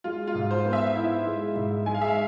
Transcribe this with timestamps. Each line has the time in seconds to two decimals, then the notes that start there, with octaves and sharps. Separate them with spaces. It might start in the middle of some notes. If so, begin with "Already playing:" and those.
0.04 G#3 F4
0.27 F4
0.34 G#2
0.51 C5
0.65 B3
0.73 E5
0.95 E4
1.26 G#3
1.56 G#2
1.86 G#3 G#5
1.94 F5
2.01 E5
2.08 F5